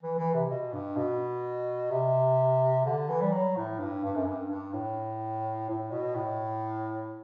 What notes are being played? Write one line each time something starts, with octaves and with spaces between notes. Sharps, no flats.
E3
E3
C3
B2
G2
B2
C3
D3
E3
G3
F#3
A2
G2
G2
F#2
G2
G2
A2
A2
B2
A2